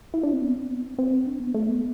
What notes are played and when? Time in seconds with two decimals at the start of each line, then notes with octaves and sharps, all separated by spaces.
0.14 E4
0.23 D4
0.33 C4
0.42 B3
0.56 C4
0.70 B3
0.85 C4
0.98 C4
1.27 D4
1.40 B3
1.54 A3
1.69 B3